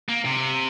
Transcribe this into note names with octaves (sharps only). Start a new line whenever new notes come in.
A#3
C3